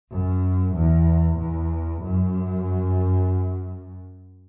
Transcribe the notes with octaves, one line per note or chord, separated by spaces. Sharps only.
F#2
E2
E2
F#2